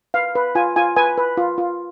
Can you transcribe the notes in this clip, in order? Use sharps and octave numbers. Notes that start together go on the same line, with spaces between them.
B4 F5
B4
F4 G#5
F4 G#5
B4 G#5
B4
F4
F4